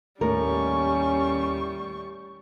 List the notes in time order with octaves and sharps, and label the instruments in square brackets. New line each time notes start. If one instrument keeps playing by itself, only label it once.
[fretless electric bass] D#2 [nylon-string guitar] A2 A#4 [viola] G3 C#6 [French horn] C#4